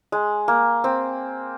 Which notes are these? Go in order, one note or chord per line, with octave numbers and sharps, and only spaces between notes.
G#3
A#3
C4